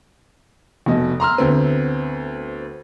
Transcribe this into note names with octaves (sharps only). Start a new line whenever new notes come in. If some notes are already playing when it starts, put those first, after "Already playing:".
F1 B2 D#5
A#5 C6 E6 F6
D2 B3 C4